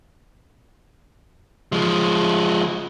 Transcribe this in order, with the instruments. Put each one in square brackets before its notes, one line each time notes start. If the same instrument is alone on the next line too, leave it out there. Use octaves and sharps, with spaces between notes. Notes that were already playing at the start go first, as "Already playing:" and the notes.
[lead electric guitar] F3 G#3